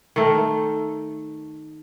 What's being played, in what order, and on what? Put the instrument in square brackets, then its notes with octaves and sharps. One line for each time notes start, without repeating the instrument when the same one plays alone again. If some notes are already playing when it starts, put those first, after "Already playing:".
[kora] D#3 A3